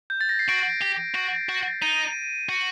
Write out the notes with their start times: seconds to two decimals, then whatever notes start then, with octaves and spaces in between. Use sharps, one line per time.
0.10 G6
0.21 A6
0.29 A#6
0.39 C7
0.49 F#4 D7
0.82 G4
1.15 F#4
1.49 F#4
1.82 D#4 D#7
2.49 F#4